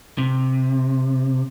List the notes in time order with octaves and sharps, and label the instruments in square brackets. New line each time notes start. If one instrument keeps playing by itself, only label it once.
[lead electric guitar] C3